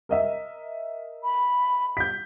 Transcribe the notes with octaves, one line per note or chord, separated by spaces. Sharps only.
A#4 D#5 E5
B5
G6 B6